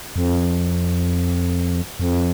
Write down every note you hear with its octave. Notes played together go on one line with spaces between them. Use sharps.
F2
F2